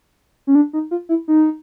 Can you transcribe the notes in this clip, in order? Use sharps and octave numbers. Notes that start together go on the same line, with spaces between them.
C#4
D4
D#4
F4
E4
D#4